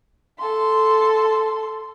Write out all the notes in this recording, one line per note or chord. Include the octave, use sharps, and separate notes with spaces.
A4 C6